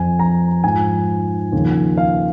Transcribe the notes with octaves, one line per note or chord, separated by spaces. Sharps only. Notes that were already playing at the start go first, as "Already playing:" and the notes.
Already playing: F2 F3 G#5
A#5
G#2 F3 G#5
D#2 C#3 F3
F5